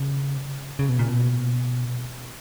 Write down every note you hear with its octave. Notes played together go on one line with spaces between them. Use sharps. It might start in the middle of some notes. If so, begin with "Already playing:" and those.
Already playing: C#3
C#3
B2
A#2
B2